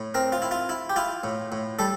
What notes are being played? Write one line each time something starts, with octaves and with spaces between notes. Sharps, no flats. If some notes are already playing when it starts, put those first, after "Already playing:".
Already playing: A2
C4 A#4
F4
E4
F4
E4
G4
E4 F4
A2
A2
G3 A4